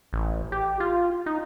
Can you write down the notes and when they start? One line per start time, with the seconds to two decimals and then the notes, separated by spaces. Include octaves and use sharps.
0.13 A1
0.52 G4
0.80 F4
1.26 D#4